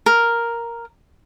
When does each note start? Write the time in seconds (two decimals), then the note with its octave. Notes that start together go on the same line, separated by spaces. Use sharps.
0.06 A#4